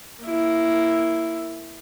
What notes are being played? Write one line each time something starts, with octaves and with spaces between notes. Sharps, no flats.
A#3 E4